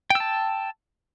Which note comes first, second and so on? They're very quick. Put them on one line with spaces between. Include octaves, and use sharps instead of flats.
G5 E6 A5